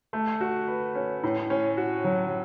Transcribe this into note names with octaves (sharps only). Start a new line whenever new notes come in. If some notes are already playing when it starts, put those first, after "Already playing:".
A3
F#4
B4
C#4
A2
C#4
F#4
F#3